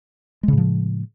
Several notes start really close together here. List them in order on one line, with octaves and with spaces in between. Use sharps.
G#3 C#3 A2 F3